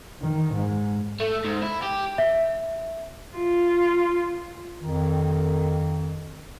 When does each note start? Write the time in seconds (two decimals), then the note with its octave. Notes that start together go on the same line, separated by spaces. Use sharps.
0.22 D#3
0.55 G#2
1.20 A3
1.45 G#2
1.62 E4
1.83 G4
2.18 E5
3.37 F4
4.82 F2 D#3